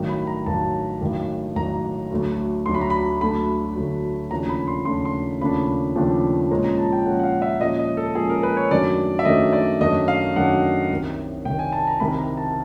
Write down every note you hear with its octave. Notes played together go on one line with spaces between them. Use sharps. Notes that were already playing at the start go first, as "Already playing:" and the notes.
Already playing: A1 G2 D#3 F#3
B5
A#5
A1 G2 D#3 F#3 A5
A1 G2 D#3 F#3
A1 G2 D#3 F#3 A#5
D2 D3 F#3 A3
D2 D3 F#3 A3 C6
B5
A#5
B5
D2 D3 F#3 A3 B5
D2 D3 F#3 A3
D#2 C#3 F3 A3 D4 A#5
B5
C6
D#2 C#3 F3 A3 D4 C6
C6
D#2 C#3 F3 A3 D4 B5
D#2 C#3 F3 A3 D4
A#2 F3 G#3 C#4 A#5
A#5
A5
G5
A#2 F3 G#3 C#4 F#5
F#5
F5
E5
A#2 F3 G#3 C#4 D#5
D#5
A4
A#2 F3 G#3 C#4 G#4
A#4
B4
C#5
F#2 D#3 F#3 A3 D4 D5
E5
F#2 D#3 F#3 A3 D4 D#5
D5
F#2 D#3 F#3 A3 D4 D#5
F5
F#2 D#3 F#3 A3 D4 F#5
C2 C3 D#3
C2 C3 D#3 G5
G#5
A5
A#5
C2 C3 D#3 B5
A#5
A5